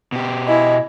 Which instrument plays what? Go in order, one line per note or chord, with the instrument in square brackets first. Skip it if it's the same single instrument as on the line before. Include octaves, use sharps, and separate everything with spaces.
[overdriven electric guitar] B2 G4
[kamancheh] E4 G#5 [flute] D#5